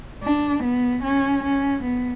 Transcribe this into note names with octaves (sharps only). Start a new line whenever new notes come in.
D4
B3
C#4
C#4
B3